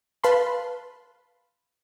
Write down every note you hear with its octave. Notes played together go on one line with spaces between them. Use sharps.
B4 F5 A5 B5 C6